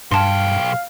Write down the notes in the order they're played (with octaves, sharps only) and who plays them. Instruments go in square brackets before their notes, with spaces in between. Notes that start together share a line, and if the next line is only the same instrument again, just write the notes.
[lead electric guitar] B1 G5 [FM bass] G2 [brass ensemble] F5 [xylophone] A5 C6